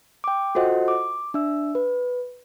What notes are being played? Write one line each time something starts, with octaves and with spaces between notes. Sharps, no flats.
G5 D6
F4 F#4 A4 C5 D#5 F#5
D6
D4 E5 E6
B4